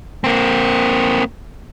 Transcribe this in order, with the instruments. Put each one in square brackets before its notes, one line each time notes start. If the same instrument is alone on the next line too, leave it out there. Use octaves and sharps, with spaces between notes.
[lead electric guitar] A#3 C4